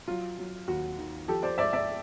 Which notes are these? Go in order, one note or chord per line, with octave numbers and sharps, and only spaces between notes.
F#3 F4
F#3
D#2 F#4
D#3
F3 G4 A4
C5 D5
G#2 D5 E5
D5 E5